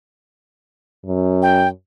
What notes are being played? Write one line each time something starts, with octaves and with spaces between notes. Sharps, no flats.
F#2
G5